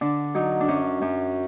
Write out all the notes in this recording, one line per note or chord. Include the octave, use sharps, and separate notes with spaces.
D3 D4
F#3 D#4
D4
F#2 C#4
F#2